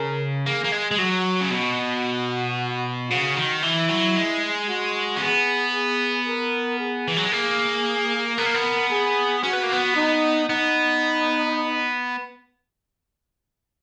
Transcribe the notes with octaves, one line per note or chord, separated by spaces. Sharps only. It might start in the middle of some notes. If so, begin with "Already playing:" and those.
Already playing: C#3 A#4
A#3 G#4
A#3
G#3
G#3
F#3 F#4
C#3
B2 F#4
C#3 F#4
D#3
E3 E4
F#3
G#3
F#4
C#4
B3 G#4
G#4
A#4
G#4
E3
F#3
G#3
A#3 G#4
B3 A#4
A#3
B3
G#4
C#4 F#4
B3
A#3
B3
D#4
B3 D#4